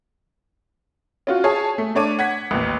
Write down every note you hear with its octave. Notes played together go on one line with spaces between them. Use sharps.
C#4 F4 F#4
G#4 C#5 G#5 A5
A3
A3 D4 C#5 D6 D#7
F#5 G#6 B6
A1 D#2